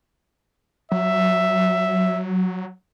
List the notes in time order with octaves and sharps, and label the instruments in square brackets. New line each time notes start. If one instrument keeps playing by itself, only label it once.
[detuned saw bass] F#3 [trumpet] E5